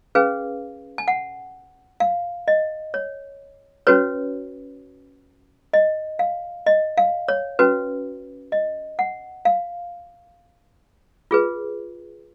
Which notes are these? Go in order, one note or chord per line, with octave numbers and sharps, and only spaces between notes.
C#4 G#4 B4 F5
G#5
F#5
F5
D#5
C#5
C#4 F#4 B4 C#5
D#5
F5
D#5
F5
C#5
C#4 F#4 B4
D#5
F#5
F5
F4 G#4 B4